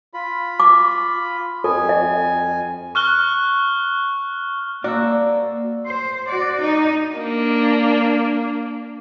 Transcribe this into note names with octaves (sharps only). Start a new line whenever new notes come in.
F4 B5
D6
F2 A4 G#5
D#5
C#6 F6 F#6 G7
G3 A#3 C4 F#4 A4 D5 E6
C5
F#4 D5
D#4
A#3 D4